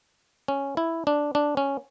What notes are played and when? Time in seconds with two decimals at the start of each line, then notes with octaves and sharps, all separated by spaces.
0.48 C#4
0.77 E4
1.07 D4
1.35 D4
1.57 C#4